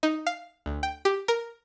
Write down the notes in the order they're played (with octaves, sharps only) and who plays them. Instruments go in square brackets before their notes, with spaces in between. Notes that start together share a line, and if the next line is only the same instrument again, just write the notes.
[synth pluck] D#4
F5
D2
G5
G4
A#4